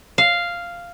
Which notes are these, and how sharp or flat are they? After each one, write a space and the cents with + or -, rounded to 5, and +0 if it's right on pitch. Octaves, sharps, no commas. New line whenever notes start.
F5 -5